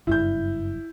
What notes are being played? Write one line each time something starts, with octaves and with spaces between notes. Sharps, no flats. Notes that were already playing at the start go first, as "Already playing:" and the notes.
F#1 G2 E4 G6